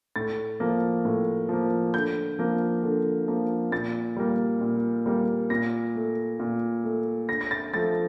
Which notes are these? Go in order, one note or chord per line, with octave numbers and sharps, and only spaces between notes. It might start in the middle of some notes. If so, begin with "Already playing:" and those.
A2 A6
F3 A#3
A2
F3 A#3
D3 G6
F3 A#3
D3
F3 A#3
A#2 A6
G3 A#3
A#2
G3 A#3
A#2 A#6
A3
A#2
A3
D3 A#6
A#6
A6
F3 A3 A6